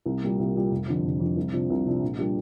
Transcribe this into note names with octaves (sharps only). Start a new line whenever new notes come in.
C2
A#2 G3 A#3
C2
A#2 G3 A#3
F1
F2 D3
F1
F2 D3
C2
C3 F3 D4
C2
C3 F3 D4
A#1
A#2 G3 D4 G4